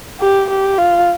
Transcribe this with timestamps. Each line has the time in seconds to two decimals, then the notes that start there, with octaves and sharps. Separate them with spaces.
0.20 G4
0.50 G4
0.78 F4